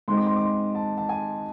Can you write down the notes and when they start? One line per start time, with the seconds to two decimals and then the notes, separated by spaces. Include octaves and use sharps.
0.08 G#2 G#3 C4 C6
0.17 D6
0.26 C6
0.36 D6
0.45 C6
0.75 A5
0.98 A5
1.09 G#5